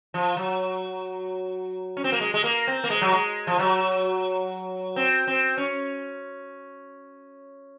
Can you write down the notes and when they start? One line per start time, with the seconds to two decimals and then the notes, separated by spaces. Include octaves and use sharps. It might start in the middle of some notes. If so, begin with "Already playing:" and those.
0.14 F3
0.37 F#3
1.97 C#4
2.04 C4
2.12 A#3
2.21 G#3
2.34 G#3
2.44 A#3
2.68 C4
2.84 A#3
2.90 G#3
3.01 F#3
3.12 G#3
3.47 F3
3.59 F#3
4.96 C4
5.27 C4
5.58 C#4